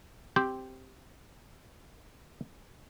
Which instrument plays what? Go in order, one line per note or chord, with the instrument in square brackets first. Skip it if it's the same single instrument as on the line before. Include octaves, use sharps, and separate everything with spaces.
[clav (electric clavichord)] C4 G4 C5 G5